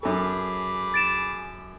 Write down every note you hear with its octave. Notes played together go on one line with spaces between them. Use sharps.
F#2 G#4 A4 B5 D6
A6 D7 E7